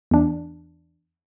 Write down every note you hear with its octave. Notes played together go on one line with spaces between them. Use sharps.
E2 D4